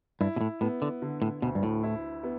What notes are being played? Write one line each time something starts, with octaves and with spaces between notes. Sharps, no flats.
G2 E4
B2
A2
A2 B3
D3
D3
A2
D2 B2
G2
A2
E4
B3